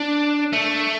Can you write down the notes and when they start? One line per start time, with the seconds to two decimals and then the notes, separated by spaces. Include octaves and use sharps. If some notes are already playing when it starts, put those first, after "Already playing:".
Already playing: D4
0.53 A3